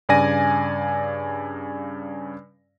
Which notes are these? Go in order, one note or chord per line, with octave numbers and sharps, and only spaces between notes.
G2 C#3 D5 G#5 A#6 D#7